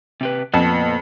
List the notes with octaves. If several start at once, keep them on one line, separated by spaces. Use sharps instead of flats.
C3 G4 B4
F2 A#2 B3 A5